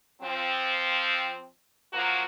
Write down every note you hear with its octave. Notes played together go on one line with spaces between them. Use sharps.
F3 C4
F3 F#3 A#3 F#4